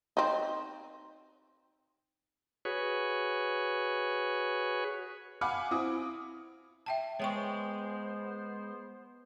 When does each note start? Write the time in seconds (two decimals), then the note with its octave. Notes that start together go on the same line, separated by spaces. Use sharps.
0.17 C4 D#4
2.65 F#4 G#4 B4 C#5
5.41 F5 F#5 G#5 B5 D6 F6
5.71 C4 E4 D#6
6.86 E5 G5 A5
7.20 G#3 B3 C5 C#5 G5 C#6